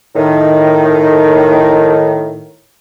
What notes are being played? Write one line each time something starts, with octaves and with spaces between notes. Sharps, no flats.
A2 D#3